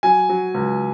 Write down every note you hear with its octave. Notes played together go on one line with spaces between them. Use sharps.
F#3 G#5
F#3
C#2